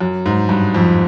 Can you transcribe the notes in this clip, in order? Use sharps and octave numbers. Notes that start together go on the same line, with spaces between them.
F#2
G#2
G2
F2